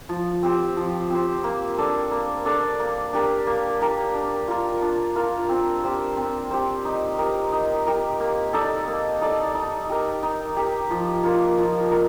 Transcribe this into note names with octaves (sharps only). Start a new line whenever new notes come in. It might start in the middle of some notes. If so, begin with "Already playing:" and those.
F3
C4 G4 C5
F3
C4 G4 C5
A#3
D4 A4 D5
A#3
D4 A4 D5
A#3
D4 G4 A#4
A#3
D4 G4 A#4
D4
F4 A#4
D4
F4 A#4
C4
G4 C5
C4
G4 C5
D#4
G4 A#4
D#4
G4 A#4
A#3
D#4 A4 D5
A#3
D#4 A4 D5
D#4
G4 A#4
D#4
G4 A#4
F3
A#3 F4 A#4
F3
A#4